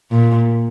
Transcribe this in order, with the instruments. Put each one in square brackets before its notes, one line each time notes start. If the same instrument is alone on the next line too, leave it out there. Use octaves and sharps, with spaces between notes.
[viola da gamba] A#2